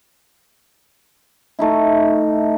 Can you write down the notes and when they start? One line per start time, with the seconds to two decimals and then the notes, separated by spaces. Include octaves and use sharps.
1.59 A3 D#4 E4